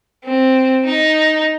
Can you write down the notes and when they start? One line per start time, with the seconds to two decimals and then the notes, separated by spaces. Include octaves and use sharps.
0.24 C4
0.85 D#4